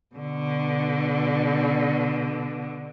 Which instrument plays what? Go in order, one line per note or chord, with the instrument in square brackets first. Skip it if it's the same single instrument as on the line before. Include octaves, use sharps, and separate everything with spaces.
[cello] B2 D3